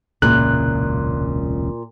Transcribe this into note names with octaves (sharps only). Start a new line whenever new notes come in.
E1 C#2 A#2 C#3 E4 F#6